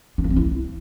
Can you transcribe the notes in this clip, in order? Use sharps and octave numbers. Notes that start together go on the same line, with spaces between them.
D4
A#3
C4
E4